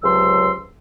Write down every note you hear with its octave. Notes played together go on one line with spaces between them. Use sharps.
C#2 C3 F#3 C6 E6